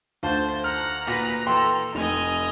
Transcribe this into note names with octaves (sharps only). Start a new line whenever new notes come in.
D2 F4 C5 A5
F#5 A#5 F6
A#2 F#4 B4 A#6
E3 A4 G5 C6
F1 D#5 G#5 F7